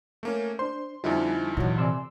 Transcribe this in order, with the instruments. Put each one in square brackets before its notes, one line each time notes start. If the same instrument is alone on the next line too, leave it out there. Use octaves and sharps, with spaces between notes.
[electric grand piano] A3 A#3 C#4
[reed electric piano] D4 C5 [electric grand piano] C6
[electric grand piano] F2 D3 F3 [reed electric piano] G3 G#5 [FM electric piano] D#4 E4
[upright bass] A#2 E3 [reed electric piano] F#3 D#5
[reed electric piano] C3 D5 G#5 [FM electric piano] C6 E6